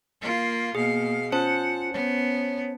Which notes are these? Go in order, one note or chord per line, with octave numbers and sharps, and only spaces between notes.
A#3 F4
B2 A#3 G#4 F5
C#4 F4 C5 F#5 A5
B3 C#5